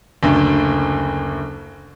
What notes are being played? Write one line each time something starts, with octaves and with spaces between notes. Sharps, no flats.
F#1 D2